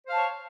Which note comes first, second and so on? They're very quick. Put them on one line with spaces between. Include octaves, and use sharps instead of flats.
C5 F5 A5 C#5